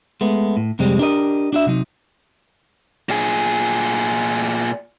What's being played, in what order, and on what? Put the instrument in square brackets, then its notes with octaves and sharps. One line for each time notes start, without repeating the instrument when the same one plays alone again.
[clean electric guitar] G#3 A3 B3
A2
F2 C3 G3 G#3 C4
D4 G4 A#4 D#5
D4 F#4 E5
C3 F#3 D#4
[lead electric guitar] A#2 G#4